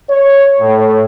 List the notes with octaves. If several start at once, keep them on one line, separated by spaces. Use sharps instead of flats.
C#5
A2